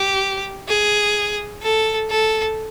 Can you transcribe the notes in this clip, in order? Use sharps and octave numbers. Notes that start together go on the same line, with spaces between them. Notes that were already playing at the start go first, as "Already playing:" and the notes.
Already playing: G4
G#4
A4
A4